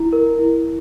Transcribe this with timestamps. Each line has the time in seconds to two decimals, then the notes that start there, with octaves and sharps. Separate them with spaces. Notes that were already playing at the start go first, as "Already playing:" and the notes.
Already playing: E4
0.13 A#4
0.39 E4